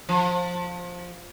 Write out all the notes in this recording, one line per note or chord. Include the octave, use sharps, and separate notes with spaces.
F3